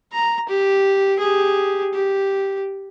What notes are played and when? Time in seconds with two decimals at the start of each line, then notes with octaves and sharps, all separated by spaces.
0.13 A#5
0.49 G4
1.19 G4 G#4
1.94 G4